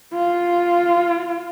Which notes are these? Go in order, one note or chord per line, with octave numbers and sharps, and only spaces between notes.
F4